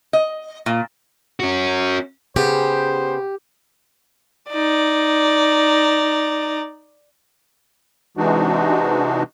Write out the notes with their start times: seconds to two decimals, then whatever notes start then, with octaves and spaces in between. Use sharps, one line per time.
0.13 D#5
0.66 A#2
1.40 C#4 F#4
2.36 C#3 B3 G4 C5
4.50 D#4 D5
8.17 C3 E3 G#3 D4 D#4 F#4